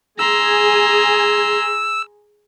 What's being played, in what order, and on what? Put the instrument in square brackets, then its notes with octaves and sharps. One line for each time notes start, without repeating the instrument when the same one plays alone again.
[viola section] G#4 G#5 [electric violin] A#5 C6 [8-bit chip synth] E6